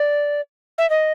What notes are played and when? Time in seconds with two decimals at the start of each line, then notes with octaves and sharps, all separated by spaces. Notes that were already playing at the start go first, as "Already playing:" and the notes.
Already playing: D5
0.78 E5
0.90 D#5